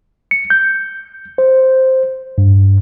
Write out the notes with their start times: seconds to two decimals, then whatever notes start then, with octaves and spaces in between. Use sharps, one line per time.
0.31 C#7
0.50 G6
1.38 C5
2.38 G2